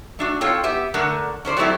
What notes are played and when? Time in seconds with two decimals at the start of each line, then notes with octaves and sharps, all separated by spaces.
0.19 A3 D4 F#4
0.41 C4 F4 A4 C#5 G5
0.64 B3 G4 E5
0.94 D3 A3 D4 A#4 F#5
1.45 C#4 D4 C5 D5
1.57 F#3 G3 A3 C4 E4 G4